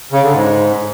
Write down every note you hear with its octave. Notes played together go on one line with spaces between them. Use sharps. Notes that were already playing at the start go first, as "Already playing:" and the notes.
C#3
D3
G#2